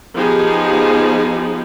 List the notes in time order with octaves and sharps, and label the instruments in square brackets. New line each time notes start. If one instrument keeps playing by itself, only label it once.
[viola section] F3 B3 D#4 G4 G#4